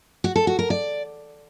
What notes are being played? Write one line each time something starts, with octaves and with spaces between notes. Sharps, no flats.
F#4
A4
F#4
A#4
D5